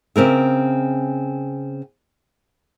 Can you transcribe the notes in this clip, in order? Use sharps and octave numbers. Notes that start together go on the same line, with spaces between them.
C#3 C4 A#4 E5